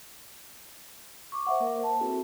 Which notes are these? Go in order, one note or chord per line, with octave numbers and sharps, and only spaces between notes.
C#6 D6
C5 E5 F#5
A#3 A#4 C5
A5
C4 E4 F#4 G#4 A4 C5